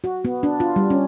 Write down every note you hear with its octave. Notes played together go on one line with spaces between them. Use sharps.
F#4
B3
D4
F4
G3
C#4